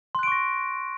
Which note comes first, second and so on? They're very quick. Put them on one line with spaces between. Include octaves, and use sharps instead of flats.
C6 F#6 D7 C#6 A#6